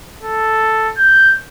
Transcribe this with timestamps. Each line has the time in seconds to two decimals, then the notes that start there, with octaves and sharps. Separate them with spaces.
0.23 A4
0.98 G6